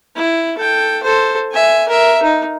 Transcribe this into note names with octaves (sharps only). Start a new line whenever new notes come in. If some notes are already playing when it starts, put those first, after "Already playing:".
E4
A4 G5
A4 C5
E5 G#5
A#4 E5
D#4